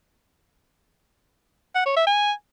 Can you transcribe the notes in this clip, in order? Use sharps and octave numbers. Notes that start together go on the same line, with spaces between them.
F#5
C#5
E5
G#5